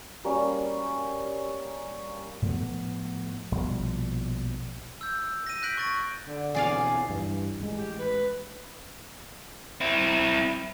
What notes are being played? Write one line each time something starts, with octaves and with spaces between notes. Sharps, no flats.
G3 A#3 C#4
A2 F3 A3 B3
A#1 B2 F3 G3
E6 G6
A#6 D#7
F#6 G6 A#6 B6 D7 F#7
C#6 A6 D7
D3
B2 E3 C4 G#4 D5 F5
G2 E3
A1 G#3
G4
B4
C4 E4